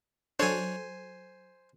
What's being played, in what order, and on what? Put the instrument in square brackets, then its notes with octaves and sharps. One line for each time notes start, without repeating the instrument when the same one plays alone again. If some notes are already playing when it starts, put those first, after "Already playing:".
[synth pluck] F#3 A4 C#7 [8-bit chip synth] D4 C#5 [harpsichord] C5 G#5